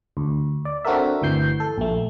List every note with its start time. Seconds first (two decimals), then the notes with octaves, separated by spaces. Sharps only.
0.17 D2
0.65 D5
0.85 C4 D4 F#4 A4 A#4 E5
1.22 G1 D2 E3 G6 C7
1.60 A4
1.78 A#1 A3